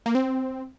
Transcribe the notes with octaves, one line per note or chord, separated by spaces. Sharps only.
A#3
C4